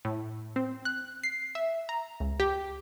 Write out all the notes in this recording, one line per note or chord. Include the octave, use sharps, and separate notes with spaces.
A2
C4
F#6
C7
E5
A#5
C#2
G4